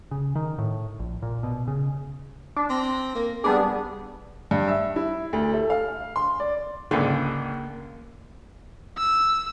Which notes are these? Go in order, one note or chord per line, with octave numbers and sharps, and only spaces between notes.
C#3
D#3
A2
A#1
A#2
B2
C#3
D4
C4 A#6
A#3
G3 B3 D4 G#4
G2
E5
E4
D2
A3
F5
C6
D5
C#2 G#2 D3 A#3
E6